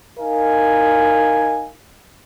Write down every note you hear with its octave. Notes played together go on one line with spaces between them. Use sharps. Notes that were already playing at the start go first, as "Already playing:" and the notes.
D#4 A#4 D#5 F5 G#5